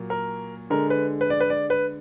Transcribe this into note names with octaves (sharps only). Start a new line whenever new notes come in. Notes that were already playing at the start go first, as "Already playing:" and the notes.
Already playing: A#2 F#3 A#3
A#4
D3 G#3 A#4
B4
B4
D5
B4
D5
B4